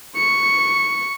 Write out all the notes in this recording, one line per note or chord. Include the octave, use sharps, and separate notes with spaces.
C#6 C#7